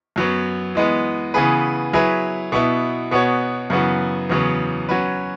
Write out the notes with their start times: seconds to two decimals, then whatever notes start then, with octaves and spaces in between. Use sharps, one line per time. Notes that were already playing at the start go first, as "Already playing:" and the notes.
0.16 F#2 F#3 B3
0.75 E3 G#3 B3
1.34 C#3 E3 B3 G#4 B4
1.93 F#3 E4 G#4 B4
2.52 B2 B3 E4
3.11 B2 B3 F#4 C#5
3.70 F#2 C#3 E3 B3 F#4
4.30 E2 C#3 F#3 B3
4.89 F#3 C#4 F#4 B4